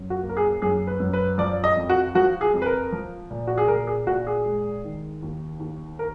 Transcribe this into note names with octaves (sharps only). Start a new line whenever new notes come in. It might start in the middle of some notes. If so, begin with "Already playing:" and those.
Already playing: F#2
F#4
A#3
A#4
G#4
F#2 G#4
B4
F#2
B4
F3 D5
D#5
F2
F#4
F3 F#4
G#4
F2
B4
A#4
F3
A#2
F#4
G#4
A#2 A#4
G#4
A#2 F#4
G#4
G#3
D#3
D#2
D#2
A#4